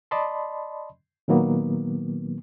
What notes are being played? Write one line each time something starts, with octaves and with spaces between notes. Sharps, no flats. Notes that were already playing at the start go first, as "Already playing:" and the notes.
D5 D#5 A5 B5 C6
A#2 D#3 F#3 A#3 B3